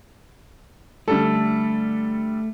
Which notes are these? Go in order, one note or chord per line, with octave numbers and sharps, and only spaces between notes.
D3 G3 A3 A4